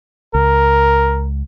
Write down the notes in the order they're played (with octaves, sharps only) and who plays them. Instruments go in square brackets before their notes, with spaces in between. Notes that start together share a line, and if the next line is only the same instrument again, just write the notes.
[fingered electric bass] C#2 [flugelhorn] A#4